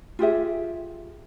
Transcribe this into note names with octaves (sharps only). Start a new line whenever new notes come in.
F4 G4 G#4 E5